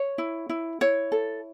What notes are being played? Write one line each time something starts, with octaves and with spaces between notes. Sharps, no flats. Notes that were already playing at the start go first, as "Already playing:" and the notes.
Already playing: C#5
E4
E4
E4 C#5
A4